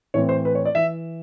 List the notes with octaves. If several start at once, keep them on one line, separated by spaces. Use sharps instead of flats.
A2 E3 A3 C4 C#5
C5
B4
C#5
D5
E3 E5